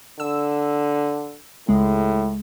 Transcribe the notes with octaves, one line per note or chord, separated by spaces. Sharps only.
D3 E6
C#2 A2 G#3